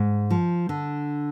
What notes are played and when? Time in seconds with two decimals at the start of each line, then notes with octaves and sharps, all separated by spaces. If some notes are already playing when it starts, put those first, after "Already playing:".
Already playing: G#2
0.31 F3
0.69 D3